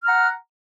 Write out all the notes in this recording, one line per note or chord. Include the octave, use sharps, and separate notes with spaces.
F#5 A#5 F6